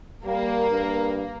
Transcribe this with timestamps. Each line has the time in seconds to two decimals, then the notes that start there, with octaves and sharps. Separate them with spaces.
0.25 G3 A#3
0.70 G2